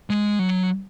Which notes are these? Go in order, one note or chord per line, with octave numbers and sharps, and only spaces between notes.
G#3
F#3